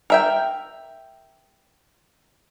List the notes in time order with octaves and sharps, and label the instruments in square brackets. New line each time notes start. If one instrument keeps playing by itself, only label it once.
[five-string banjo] A#4 E5 G5